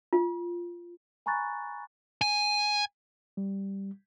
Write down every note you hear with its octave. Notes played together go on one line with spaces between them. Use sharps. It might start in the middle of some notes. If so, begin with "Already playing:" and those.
F4
G#5 A#5 B5 C#6 F#6 A6
G#5
G3